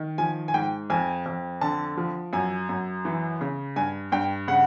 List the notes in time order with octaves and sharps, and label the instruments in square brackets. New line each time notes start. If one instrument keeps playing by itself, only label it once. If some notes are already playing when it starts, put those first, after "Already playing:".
Already playing: [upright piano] D#3
F3 G#5
G#5
G#2 G5
F2 G#5
F2
D3 A5
F3
F#2 G#5
F#2
E3
C#3
G2 G#5
G2 G5
C#3 F#5